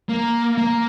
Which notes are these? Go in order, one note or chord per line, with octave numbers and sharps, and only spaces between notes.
A#3
A#3